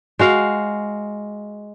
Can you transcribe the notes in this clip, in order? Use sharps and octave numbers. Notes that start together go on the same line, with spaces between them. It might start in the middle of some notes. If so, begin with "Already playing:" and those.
G#3 F#4 F5